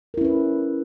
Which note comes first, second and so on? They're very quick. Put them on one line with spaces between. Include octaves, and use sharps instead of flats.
A#4 E4 C#4 B4